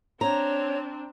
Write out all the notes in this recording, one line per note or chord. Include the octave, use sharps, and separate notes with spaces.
C4 D4 C#5 A#5